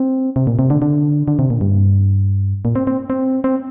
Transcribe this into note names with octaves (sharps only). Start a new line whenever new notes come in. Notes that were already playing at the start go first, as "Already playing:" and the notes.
Already playing: C4
C3
A#2
C3
D3
D3
D3
C3
A#2
G2
A#2
C4
C4
C4
C4